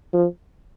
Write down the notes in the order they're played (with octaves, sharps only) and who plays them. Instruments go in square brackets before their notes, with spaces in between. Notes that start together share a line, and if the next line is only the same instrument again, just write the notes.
[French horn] F3